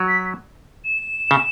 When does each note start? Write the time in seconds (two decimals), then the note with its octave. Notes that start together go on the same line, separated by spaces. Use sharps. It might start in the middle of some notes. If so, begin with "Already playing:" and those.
Already playing: F#3
0.08 B6
0.84 E7
1.31 C#3